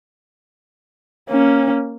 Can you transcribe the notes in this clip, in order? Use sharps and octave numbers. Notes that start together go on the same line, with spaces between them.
A#3 C#4